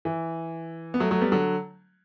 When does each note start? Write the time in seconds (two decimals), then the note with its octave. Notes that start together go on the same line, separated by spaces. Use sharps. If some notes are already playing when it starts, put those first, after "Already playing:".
0.05 E3
0.94 B3
1.00 F#3 A3
1.11 F#3 A3
1.21 G3 B3
1.32 D3 F#3